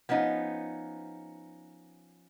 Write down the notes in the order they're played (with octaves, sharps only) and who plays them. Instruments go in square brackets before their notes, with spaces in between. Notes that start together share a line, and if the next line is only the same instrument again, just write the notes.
[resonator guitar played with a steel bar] F3 B3 C#4 D#4